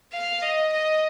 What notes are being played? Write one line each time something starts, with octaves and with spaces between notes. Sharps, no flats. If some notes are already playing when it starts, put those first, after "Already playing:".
F5
D#5
D#5